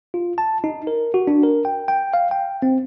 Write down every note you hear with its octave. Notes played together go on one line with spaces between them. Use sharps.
F4
A5
D#4
A#4
F#4
D4
A#4
G5
G5
F5
G5
C4